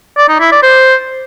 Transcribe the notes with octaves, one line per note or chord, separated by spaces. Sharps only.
D5
D#4
E4
D5
C5